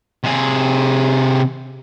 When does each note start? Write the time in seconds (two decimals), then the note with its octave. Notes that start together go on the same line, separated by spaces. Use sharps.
0.24 C3 G#4